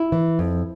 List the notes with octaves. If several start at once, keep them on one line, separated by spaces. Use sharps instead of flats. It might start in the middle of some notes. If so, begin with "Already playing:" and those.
Already playing: E4
E3
F2